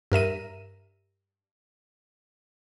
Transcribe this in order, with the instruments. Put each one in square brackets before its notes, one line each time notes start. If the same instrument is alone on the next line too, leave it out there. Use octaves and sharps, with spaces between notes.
[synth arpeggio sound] G2 A#4 E5 D#7